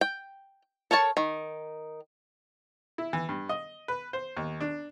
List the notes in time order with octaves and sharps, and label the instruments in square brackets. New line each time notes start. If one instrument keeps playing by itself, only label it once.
[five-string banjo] G5
A4 A#4 C#5 A5
D#3
[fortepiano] E4
E3
G2
D#5
B4
C5
D#2
D4